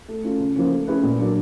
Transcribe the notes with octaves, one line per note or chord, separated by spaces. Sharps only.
A3
C#4 F4 A4
C#3
F3 A#3 C#4
A3
C#4 E4 G#4 B4
A#2
F#3 A#3 D4